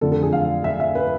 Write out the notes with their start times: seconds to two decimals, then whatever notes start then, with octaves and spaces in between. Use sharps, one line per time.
0.01 F2 D3 F3 A3 A4
0.12 A4
0.23 G#4
0.32 F5
0.64 E5
0.80 E5
0.95 B4